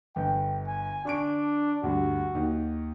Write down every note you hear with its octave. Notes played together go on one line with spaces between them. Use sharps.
G1 G5
G#5
D3 D4 C#6 D7
D2 G2 F#4
D#2